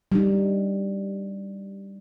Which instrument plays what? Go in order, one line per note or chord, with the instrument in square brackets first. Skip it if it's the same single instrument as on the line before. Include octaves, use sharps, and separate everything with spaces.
[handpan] G3 D#4